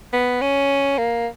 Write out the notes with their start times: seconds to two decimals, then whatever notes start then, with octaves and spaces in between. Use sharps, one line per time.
0.13 B3
0.42 C#4
0.98 A#3